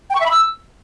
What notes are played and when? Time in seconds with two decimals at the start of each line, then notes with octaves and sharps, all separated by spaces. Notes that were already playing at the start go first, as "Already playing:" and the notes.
0.10 G5
0.15 C#6
0.20 E5
0.26 B5
0.31 E6